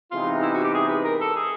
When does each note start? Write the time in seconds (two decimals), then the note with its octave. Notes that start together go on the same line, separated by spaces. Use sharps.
0.12 C3 E3 G#3 B3 D#4 F4
0.42 E4
0.54 F#4
0.64 G4
0.74 G#4
0.89 B4
1.05 A#4
1.21 A4
1.36 G#4